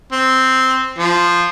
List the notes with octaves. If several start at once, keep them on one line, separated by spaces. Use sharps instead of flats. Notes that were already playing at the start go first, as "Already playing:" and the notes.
C4
F3